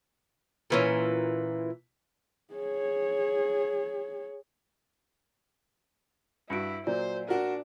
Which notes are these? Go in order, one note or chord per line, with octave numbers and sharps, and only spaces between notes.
A#2 E3 C#4
G#4 C#5
G2 E4 F#4 C#7 D7
A#2 F#3 C5 D5
D4 F#4 A#4